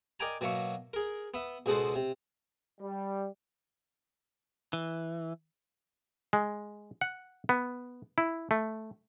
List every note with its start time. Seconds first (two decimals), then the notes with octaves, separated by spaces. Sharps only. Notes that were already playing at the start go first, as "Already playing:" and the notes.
0.20 A#4 D5 D#5 G5 G#5 A#5
0.41 B2 F#3 A#3 E5 C#6
0.93 G#4 A#4
1.34 B3 E5
1.66 C#2 B2 G#3 F#4 A4 C5
1.95 C3
2.81 G3
4.73 E3
6.33 G#3
7.01 F#5
7.49 B3
8.18 E4
8.51 A3